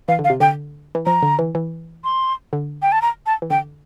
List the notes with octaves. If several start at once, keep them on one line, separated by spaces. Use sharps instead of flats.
E3 F5
D3
F5
C3
D3 G5
E3
F3 A#5
D3
E3
E3
C6
D3
G5
A5
A#5
A5
E3
D3 G5